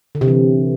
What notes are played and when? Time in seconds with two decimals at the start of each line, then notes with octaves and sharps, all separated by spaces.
0.15 D3
0.21 C3
0.28 E3